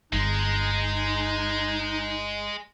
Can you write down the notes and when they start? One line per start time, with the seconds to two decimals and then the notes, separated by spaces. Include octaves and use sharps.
0.13 G1 G#3 D#4